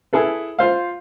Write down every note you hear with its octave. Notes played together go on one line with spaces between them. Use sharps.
E4 G#4 A4 B4
F4 C5 F5